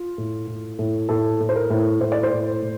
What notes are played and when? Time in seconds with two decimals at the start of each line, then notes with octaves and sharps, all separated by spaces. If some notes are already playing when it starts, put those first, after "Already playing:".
Already playing: F4
0.18 A2
0.47 A2
0.79 A2
1.09 A2 A4
1.40 A2
1.49 C5
1.55 A#4
1.70 A2
2.01 A2 C5
2.12 D5
2.23 C5
2.32 A2
2.62 A2